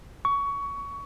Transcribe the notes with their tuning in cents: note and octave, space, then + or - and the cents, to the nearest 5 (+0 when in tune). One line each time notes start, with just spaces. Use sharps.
C#6 +20